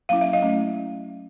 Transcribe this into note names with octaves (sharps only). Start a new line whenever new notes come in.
F#3 A#3 C#4 E4 F5
E5
D#5 F5
A3 C#4 E4